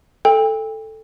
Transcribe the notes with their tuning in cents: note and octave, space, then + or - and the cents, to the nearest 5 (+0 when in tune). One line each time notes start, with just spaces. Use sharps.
A4 +0 G5 +35